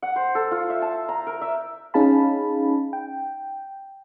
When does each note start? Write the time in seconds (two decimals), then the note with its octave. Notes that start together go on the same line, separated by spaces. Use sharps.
0.02 F#5
0.16 C5
0.35 A4
0.51 F4
0.70 E5
0.82 A5
1.09 A#5
1.27 A#4
1.41 E5
1.94 C#4 D#4 G#4 F5 A5 B5
2.93 G5